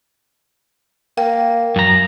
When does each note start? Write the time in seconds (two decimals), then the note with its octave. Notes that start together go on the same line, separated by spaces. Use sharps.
1.18 A#3 G5
1.76 F#2 A#5